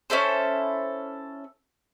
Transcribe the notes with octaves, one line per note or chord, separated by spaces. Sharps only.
C#4 E4 A4 C5